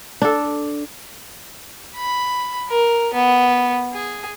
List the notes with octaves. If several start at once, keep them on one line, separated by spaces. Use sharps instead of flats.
D4 A4
B5
A#4
B3
G#4